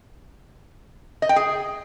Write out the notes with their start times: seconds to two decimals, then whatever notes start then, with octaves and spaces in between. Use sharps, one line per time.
1.22 D#5
1.29 G5
1.36 G#4